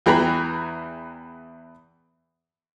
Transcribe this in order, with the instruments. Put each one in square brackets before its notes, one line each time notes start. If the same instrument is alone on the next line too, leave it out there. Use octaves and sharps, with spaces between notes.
[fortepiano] E2 E3 G#4 G5 A#5 B5